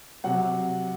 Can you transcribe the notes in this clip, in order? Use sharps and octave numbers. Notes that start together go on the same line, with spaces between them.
C3 F#3 F#5